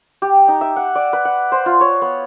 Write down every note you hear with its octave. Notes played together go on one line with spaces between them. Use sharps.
G4
D#4
E5
F#5
D5
B4
F#5
C5
F4
C#5
B3